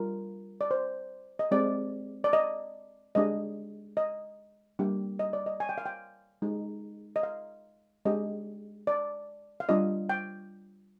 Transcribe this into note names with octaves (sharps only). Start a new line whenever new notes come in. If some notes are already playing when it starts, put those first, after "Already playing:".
Already playing: G3 D4 F4 A#4
D5
C5
D#5
G#3 C4 G4 D5
D5
D#5
G#3 D4 G4 D#5
D#5
G3 A#3 D4 G4
D#5
D5
D#5
G#5
G5
F5
G5
G#3 D#4 G4
D#5
F5
G#3 D4 G4 D#5
D5
F5
G3 D4 F4 D#5
G5